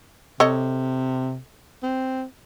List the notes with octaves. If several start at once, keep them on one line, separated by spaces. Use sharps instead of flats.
C3 A4 C#5 D#5
C4